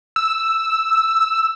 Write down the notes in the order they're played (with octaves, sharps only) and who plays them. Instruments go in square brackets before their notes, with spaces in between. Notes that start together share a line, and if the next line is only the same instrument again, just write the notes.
[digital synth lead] E6